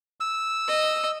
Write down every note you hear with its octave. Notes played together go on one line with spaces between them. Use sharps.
E6
D#5